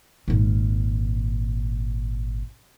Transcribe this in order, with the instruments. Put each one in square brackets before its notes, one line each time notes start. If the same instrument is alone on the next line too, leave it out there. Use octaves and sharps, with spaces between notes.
[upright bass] G#1 A#2